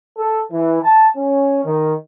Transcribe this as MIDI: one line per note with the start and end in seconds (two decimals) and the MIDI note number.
0.18 0.41 69
0.51 0.78 52
0.82 1.07 81
1.16 1.62 61
1.64 1.91 51